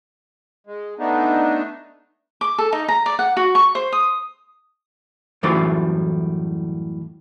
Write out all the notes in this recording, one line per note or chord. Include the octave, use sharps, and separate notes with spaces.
G#3
A3 B3 D4 D#4
D6
A4
D#4
A#5
D5
F#5
F#4
C#6
C5
D#6
F#2 A2 E3 G3 F4 D5